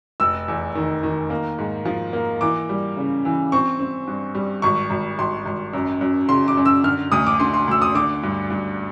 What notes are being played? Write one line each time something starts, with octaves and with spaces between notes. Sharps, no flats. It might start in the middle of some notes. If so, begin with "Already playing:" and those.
F1 E6
E2
D#3
D#3
A#3
G#2
F3
A#3
E3 D6
G3
C#3
E3
C4 C#6
C4
G2
G3
G#1 C#6
G#1
G#1 C6
G#1
F#2
F#2
C#3 C6
D6
F#2
E6
D3 F6
D2 D#6
D6
D3 C6
C6
D2 E6
D#6
D3 D6
G2
G2